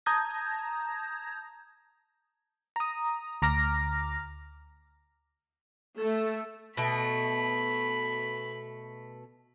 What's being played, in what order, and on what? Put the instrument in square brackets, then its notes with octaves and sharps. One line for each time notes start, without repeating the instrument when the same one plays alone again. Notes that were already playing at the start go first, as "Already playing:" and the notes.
[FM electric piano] A5 A#5 D#6 G6 G#6 A#6
A#5 D#6
D2 A#5 D6 F6 A#6
[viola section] A3
[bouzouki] B2 A3 [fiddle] B5